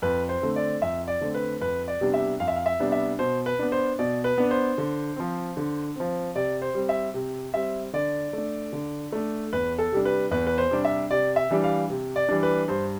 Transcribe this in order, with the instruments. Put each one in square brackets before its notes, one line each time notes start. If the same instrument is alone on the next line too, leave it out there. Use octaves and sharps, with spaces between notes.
[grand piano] F2 B4
C5
D3 A3 C4
D5
F2 E5
D5
D3 A3 C4
B4
F2 B4
D5
C3 G3 B3 D4
E5
F2 F5
E5
F5
E5
C3 G3 B3 D4
E5
B2 C5
B4
B3 D4
C5
B2 D5
B4
B3 D4
C5
D3
F3 C4
D3
F3 C4
C3 D5
C5
G3 C4
E5
C3
G3 C4 E5
D3 D5
A3 D4
D3
A3 D4
E2 B4
A4
C3 G3 D4
B4
E2 B4
B4
C5
C3 G3 D4
E5
C3 D5
E5
E3 G3 D4
F5
C3
D5
E3 G3 D4
B4
G2 C5